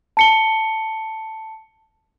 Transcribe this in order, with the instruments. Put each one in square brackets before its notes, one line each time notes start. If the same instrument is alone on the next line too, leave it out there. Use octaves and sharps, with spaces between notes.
[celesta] A5 C#7 G7